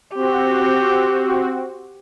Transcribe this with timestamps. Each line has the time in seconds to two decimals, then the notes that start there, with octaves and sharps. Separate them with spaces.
0.15 C4 F#4 G4